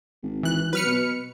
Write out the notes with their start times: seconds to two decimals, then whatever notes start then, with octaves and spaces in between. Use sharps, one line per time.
0.22 G#1
0.43 E3 F#6
0.73 F#3 B4 F6 C#7
0.86 B2